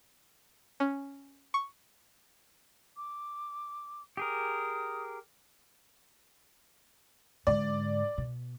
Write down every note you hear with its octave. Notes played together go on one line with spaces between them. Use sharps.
C#4
C#6
D6
G4 G#4 A#4 D#6
G#2 D3 D5
B2